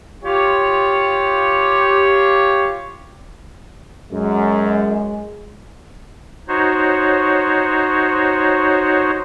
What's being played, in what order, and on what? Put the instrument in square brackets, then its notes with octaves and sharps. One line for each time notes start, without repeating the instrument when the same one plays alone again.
[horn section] F4 G4 C#5
[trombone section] F#2 [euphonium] G#3
[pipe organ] D#4 F#4 C5 C#5